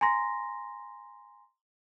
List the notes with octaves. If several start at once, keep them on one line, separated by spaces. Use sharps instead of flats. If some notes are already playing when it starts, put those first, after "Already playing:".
G#5 A#5 C6 A#6